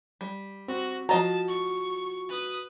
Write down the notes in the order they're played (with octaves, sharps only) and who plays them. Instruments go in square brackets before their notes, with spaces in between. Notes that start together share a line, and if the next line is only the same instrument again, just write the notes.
[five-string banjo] G3
[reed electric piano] C4 [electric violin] F#4
[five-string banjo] F3 D#5 A#5 [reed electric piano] F#4 [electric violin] A5
[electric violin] C#6
B4 D#6